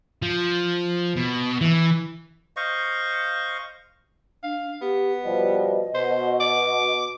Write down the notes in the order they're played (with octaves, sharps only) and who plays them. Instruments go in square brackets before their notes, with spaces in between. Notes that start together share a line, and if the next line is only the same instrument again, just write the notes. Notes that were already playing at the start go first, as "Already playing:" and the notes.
[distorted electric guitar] F3
B2
E3
[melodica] C5 D#5 F5 C#6
[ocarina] D4 [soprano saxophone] F5
[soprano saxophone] B3 [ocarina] G4
[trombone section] B2 F3 G3 [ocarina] D#5
[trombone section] B2 [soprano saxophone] C5
[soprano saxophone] D6